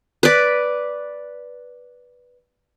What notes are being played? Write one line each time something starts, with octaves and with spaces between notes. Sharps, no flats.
B4 D5